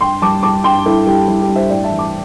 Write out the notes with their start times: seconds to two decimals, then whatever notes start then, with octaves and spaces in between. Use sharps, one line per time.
0.01 G2 G5 C6
0.22 G3 A5 D6
0.43 G3 A5 D6
0.64 G2 G5 C6
0.85 G2 E4 A4
1.06 G3 G4
1.28 G3 E4
1.42 G4
1.49 G2
1.56 C5 E5
1.70 A2 D5 G5
1.84 E5 A5
1.91 E3
1.98 A5 D6